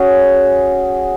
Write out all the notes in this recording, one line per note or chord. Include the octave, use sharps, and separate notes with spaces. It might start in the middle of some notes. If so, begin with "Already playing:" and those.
Already playing: C#4 F#4 G#4